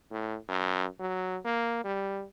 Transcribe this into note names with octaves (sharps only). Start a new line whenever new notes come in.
A2
F#2
F#3
A#3
G3